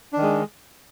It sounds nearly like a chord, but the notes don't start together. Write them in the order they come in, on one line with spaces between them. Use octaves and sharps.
D4 D#3 G#3